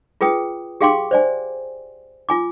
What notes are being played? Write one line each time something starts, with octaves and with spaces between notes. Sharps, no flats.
F4 G#4 B4 G5 D#6
G4 G#4 F5 G5 C6 D6
C5 D5 G#5
F4 G#5 D6